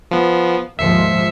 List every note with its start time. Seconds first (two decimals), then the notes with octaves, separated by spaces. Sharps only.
0.11 F3 B3
0.79 D#2 G#2 F3 E5 C7 C#7